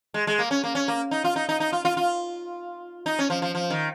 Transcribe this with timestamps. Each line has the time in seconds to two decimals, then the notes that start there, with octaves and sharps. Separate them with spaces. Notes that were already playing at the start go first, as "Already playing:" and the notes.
0.14 G#3
0.27 G#3
0.39 A#3
0.51 C#4
0.64 A#3
0.75 C#4
0.88 A#3
1.11 D#4
1.24 F4
1.36 D#4
1.49 D#4
1.60 D#4
1.72 F4
1.85 F4
1.97 F4
3.06 D#4
3.19 C#4
3.30 F3
3.42 F3
3.55 F3
3.70 D#3